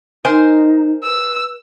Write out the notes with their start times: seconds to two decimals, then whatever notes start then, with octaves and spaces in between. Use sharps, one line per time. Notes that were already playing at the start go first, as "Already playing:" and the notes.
0.25 D#4 A#4 C5 G#5
1.03 B4 E6